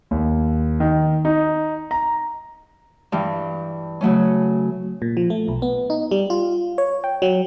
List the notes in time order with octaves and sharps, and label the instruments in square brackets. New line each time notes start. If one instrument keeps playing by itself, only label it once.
[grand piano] D#2
D#3
D#4
A#5
[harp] G2 E3 G3
C#3 F#3 A3 C#4
[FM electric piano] A#2
F3
A3
B1
B3
D#4
G3
F4
C#5
G5
F#3